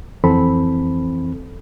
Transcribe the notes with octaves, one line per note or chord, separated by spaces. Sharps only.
F2 E3 C4 A4 B5